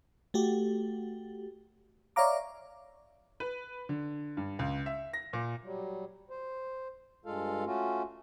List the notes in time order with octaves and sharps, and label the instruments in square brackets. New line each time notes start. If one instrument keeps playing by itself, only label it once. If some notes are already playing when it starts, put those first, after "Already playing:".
[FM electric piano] A3 F#4 G4
C#5 D5 E5 F5 A#5 D6
[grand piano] B4
D3
G2
C#2
E5
A#6
A#2
[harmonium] F#3 G3
C5
G2 G#3 F4 A4 F5
A3 C#4 F4 F#4